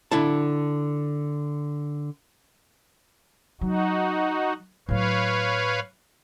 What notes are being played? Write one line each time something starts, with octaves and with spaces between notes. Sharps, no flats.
D3 E4 A5
F#3 D#4 F#4
A2 F#3 B4 C#5 F5